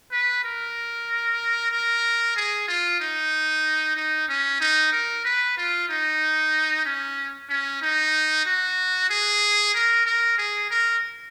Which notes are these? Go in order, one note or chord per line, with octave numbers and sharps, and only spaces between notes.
B4
A#4
A#4
G#4
F4
D#4
D#4
C#4
D#4
A#4
B4
F4
D#4
C#4
C#4
D#4
F#4
G#4
A#4
A#4
G#4
A#4